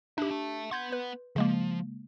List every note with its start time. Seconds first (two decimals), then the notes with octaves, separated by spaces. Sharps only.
0.18 D4 D#4 G4 E5
0.31 E5 A5
0.71 B3 F#5 C6 G6 G#6
0.92 B4
1.36 C#3 F3 G#3 A#3